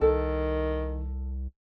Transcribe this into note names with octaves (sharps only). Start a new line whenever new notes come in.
C2 D#3 A4